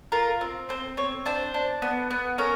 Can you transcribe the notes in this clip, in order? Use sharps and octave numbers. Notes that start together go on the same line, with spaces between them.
F4 A#4
C4
C4 C5
C4 C#5
D4 C5
D4
B3
B3
C#4 A#4